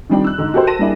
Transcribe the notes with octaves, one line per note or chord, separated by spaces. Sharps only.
D#3 F3 G3 C4 D4
E6 F#6
G#2 D3
F#4 G4 A4 A#4 C5
A5 A#6 D#7 E7
G3 A#3 D4 E4 G#4